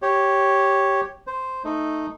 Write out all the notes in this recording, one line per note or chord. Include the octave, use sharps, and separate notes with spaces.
G4 C#5
C5
A3 D#4